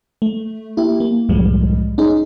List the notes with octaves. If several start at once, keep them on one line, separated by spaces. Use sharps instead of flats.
A3
A#3 E4 G4
A#3
C2 F#2 A2 F3 G3 G#3
C#4 D#4 G#4